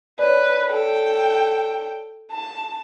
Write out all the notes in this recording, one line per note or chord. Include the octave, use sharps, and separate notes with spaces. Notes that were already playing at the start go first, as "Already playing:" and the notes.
B4 C#5 D5
A4 G5
A5